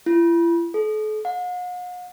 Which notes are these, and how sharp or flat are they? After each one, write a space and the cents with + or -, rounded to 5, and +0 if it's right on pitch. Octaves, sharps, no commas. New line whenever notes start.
E4 +45
A4 -40
F#5 -45